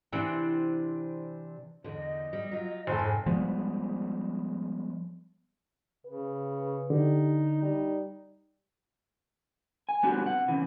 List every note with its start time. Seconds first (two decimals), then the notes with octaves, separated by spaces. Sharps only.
0.12 C3 E3 C4 D4 F#5
1.84 E2 D3 D#5
2.33 G3
2.51 F#3 F4
2.87 F1 A4 C5 G#5
2.99 G#2 G#5
3.26 F3 G3 G#3 B3
6.06 C#3 B4
6.90 D3 D#4 G4
7.62 G3 D#4
9.89 G#5
10.03 G3 B3 D4 F#4 G4
10.25 C3 F#5
10.48 E2 G#2 C#3 E3